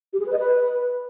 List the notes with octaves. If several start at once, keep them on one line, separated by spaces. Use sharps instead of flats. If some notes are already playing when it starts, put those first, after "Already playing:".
G4
G#4
B4
D#5
B4